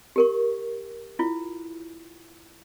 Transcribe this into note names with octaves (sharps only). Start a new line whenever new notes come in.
G4 A#4 C#6
E4 F4